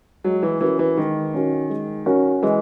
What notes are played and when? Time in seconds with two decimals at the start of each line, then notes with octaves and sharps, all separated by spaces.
0.24 F#3 G#3
0.43 E3
0.61 E3 C#4 F#4 A#4
0.79 E3
0.97 D#3 G#3
1.34 C#4 F#4 A#4
1.70 G#3
2.06 C#4 F#4 A#4
2.43 E3 G#3